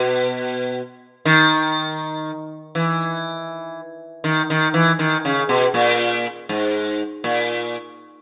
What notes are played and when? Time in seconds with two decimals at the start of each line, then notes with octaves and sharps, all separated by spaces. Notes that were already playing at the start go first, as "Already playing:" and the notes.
Already playing: B2
1.25 D#3
2.75 E3
4.24 D#3
4.50 D#3
4.74 E3
4.99 D#3
5.25 C#3
5.49 B2
5.74 A#2
6.49 G#2
7.24 A#2